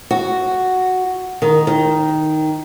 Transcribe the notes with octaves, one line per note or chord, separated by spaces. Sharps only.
F#4
D#3
D#3